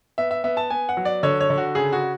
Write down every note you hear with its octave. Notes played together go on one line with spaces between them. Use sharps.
B3 E5
E5
B3 E5
A5
B3 G#5
F#5
F#3
D5
D3 C#5
C#5
D3
F#4
C#3 G#4
F#4